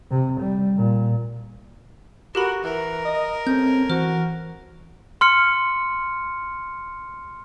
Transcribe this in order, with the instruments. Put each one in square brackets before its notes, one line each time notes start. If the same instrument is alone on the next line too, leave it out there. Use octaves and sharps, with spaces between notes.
[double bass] C3
G3
A#2
[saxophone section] F#4 [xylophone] G4 A4 B5 [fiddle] A#4
[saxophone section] E3 [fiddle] A#4
[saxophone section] D#5
[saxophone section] G3 A3 C#4 [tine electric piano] C4 [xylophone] G6
[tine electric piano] E3 [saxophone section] F#4 [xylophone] C5 F6
[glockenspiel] C6 F6 C#7